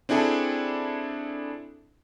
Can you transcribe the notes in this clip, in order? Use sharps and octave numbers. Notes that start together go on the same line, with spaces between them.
C4 D4 E4 G#4 A4